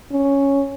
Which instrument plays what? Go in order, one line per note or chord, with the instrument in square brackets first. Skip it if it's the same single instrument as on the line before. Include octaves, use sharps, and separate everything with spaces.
[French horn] C#4